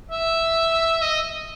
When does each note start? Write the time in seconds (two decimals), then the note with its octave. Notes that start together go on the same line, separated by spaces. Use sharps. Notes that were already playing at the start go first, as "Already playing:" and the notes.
0.11 E5
1.02 D#5